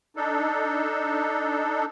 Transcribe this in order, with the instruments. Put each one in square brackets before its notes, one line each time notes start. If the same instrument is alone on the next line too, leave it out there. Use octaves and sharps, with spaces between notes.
[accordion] D4 D#4 A4